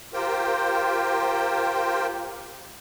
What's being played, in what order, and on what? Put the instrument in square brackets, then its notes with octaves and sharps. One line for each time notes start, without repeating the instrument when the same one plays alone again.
[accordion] F4 G4 A#4 C5 G5